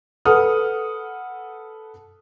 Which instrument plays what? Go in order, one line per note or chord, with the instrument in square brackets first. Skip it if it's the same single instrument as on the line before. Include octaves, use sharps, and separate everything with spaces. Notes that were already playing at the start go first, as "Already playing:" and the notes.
[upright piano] A4 B4 F#5 D#6 F6